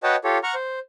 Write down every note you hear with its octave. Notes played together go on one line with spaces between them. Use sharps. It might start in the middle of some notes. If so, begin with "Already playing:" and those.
F#4 B4 C#5 D#5 G5 A5
F4 G4 A4 C#5
F#5 A#5 C#6 F6
C5